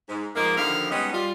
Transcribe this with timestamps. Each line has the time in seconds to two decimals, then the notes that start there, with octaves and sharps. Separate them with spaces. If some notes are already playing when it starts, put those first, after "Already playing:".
0.09 G#2
0.35 G#2 F3 G#3 A#3
0.57 D#2 D3 F3 A#3 E4 F5
0.91 G3 G#3 B3 C#4 D#4
1.13 G3 F4